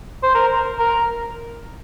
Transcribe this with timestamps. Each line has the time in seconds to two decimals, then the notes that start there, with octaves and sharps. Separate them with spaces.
0.23 C5
0.34 A#4
0.79 A#4